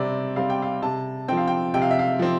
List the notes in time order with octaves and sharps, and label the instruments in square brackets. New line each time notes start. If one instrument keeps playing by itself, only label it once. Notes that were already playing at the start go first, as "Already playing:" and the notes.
Already playing: [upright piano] C3 G3 C4 D5
G3 C4 F5
G5
F5
C3 A5
F3 C4 G5
F5
G5
C3 G5
F5
E5
F5
F3 C4